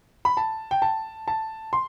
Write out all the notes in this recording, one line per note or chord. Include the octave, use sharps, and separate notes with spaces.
B5
A5
G5
A5
A5
C6